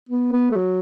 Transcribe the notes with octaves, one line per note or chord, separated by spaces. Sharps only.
B3
B3
A3
F#3